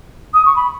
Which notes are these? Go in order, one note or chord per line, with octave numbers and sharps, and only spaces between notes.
D#6
C#6
B5